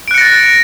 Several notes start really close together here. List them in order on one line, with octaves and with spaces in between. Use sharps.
D7 F#6 C#7 A#6 A6